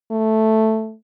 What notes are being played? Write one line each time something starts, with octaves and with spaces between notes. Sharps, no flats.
A3